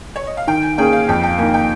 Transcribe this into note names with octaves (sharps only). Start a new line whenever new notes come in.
C#5
D#5
F5
D#3 G5
G#5
A#3 C#4 G#4 G5
F5
F2 G5
G5
D#3 A#3 G#5
G5